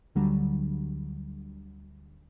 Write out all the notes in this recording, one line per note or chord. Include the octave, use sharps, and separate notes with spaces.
D2 D3 F#3 G3